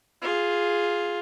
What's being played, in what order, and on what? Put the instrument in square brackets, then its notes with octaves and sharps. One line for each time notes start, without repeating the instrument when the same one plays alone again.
[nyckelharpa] F4 G#4